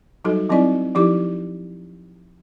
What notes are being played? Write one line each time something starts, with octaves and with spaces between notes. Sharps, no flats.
F#3 G3 D#4 F#4 A4
F#3 C4 D#4 E4 D5
F3 D#4 E4 G4 D6